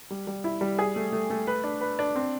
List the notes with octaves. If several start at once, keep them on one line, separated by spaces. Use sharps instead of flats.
G3
G3
E4
G3
G#4
A3
A3
A3
B4
D4
B4
D4
C4